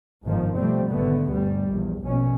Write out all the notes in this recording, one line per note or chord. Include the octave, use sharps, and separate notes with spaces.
G1 G#2 D#3 F3
B2 F3 G3 A3 C4
G#1 D3 A3 B3
G1 D2 G3
A#1 E2
A#1 B2 C#4